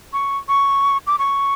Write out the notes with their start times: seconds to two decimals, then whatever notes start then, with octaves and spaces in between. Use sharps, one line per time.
0.13 C#6
0.48 C#6
1.07 D6
1.19 C#6